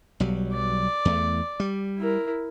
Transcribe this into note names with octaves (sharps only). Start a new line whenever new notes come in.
B1 F#3 G3
D5
E2 A3
G3
E4 A#4